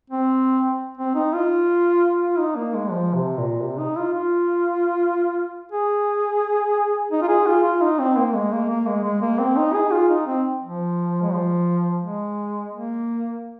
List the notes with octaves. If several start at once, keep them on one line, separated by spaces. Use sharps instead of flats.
C4
C4
D#4
F4
F4
D#4
A#3
G#3
F3
C3
A#2
C3
D#4
F4
F4
G#4
D#4
F4
G#4
F4
F4
D#4
C4
A#3
G#3
A#3
A#3
G#3
G#3
A#3
C4
D#4
G#4
F4
D#4
C4
F3
G#3
F3
G#3
A#3